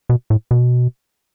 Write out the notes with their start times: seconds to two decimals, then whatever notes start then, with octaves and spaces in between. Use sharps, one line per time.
0.09 B2
0.30 A2
0.51 B2